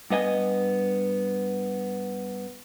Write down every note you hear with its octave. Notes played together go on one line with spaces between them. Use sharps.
G2 B3 D#5 G#5